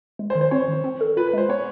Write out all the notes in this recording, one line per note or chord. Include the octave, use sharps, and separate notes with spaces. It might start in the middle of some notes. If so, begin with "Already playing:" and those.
G#3
C5
D#3
C5
C4 C#5
D#3
C4
A4
F4 B4
B4
G#3 C5
B3 C#5